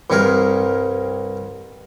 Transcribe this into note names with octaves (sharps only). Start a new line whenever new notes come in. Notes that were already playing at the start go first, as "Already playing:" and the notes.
C2 G2 C3 D#4 G#4 A#4